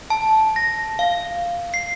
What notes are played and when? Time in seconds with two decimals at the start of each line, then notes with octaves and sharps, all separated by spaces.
0.10 A5
0.56 A#6
0.99 F5
1.74 C7